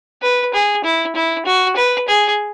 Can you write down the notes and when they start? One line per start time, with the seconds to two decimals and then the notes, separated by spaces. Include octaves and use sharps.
0.22 B4
0.53 G#4
0.84 E4
1.15 E4
1.45 F#4
1.76 B4
2.08 G#4